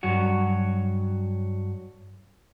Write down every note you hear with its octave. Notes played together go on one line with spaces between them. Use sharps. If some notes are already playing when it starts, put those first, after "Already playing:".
G2 F#3 F#4